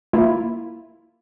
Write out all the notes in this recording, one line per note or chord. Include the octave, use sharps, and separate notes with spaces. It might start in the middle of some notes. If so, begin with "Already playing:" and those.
A#3 E4 F4